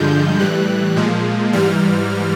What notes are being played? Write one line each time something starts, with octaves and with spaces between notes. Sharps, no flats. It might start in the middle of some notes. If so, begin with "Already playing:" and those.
Already playing: G2 D3 F3 G#3 G6
A2 E3 G3 F#6
A#2 F3 G#3
G#2 E3 G3 F6